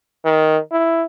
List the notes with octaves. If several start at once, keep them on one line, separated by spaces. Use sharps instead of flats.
D#3
E4